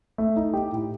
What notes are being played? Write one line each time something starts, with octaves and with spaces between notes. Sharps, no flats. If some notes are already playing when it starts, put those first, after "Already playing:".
A3
D#4
G4
A2